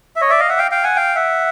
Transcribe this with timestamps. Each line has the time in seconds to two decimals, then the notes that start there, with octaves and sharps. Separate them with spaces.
0.16 E5
0.21 C#5 D#5
0.30 D5 E5
0.40 D#5 F5
0.49 E5 F#5
0.58 F5 G5
0.71 F5 G5
0.84 F#5 G#5
0.96 F5 G5
1.15 E5 F#5